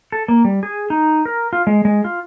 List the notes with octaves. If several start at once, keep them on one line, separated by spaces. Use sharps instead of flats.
A4
A#3
G3
G#4
D#4
A#4
F4
G#3
G#3
F4